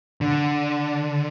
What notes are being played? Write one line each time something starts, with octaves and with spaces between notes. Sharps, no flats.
D3